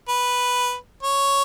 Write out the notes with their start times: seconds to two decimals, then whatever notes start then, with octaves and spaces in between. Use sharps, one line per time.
0.09 B4
1.03 C#5